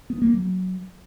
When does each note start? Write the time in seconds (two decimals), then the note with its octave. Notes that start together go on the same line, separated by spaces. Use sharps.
0.10 B3
0.22 A#3
0.33 F#3